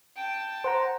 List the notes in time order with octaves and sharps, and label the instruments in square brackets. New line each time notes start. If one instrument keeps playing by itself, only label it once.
[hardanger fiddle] G5 A5
[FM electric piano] C5 F#5 A#5